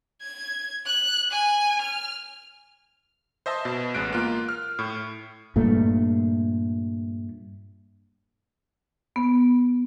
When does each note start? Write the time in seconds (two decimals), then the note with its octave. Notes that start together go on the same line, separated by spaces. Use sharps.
0.22 G#6
0.86 F#6
1.31 G#5
1.82 F6
3.46 C5 D#5 E5 A5
3.65 B2
3.94 A1 G#3 B3 F#6 D7
4.13 A#3 F4
4.49 F6
4.79 A2
5.56 G2 A#2 A3
9.16 B3